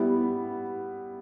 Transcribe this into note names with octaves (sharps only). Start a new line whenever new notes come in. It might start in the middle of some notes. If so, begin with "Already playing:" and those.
Already playing: G3 B3 E4